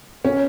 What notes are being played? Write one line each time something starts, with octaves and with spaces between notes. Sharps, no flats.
C#4